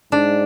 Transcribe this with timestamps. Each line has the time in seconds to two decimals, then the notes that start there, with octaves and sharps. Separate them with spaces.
0.12 G#2 D4